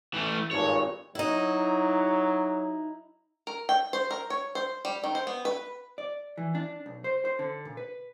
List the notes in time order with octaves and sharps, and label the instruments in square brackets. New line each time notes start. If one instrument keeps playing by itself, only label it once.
[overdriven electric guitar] E3 A3
[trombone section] G#1 G2 A#2 [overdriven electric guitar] C#5
[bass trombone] F#3 [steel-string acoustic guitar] D#4 E4
[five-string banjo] A#4
G5
C5
A#4
C#5
C5
G3
D#3
C5
B3
B4
[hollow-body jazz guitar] D5
E3
D4
B1
C5
C5
D3
A#2
B4